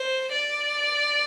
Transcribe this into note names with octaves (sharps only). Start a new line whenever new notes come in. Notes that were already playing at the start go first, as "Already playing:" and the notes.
Already playing: C5
D5